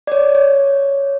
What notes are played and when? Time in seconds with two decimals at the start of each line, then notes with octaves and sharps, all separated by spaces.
0.07 D5
0.12 C#5
0.35 C#5